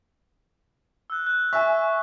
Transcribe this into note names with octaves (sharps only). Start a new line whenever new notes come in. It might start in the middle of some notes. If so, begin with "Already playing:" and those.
E6 F#6
F#6
E5 G#5 C#6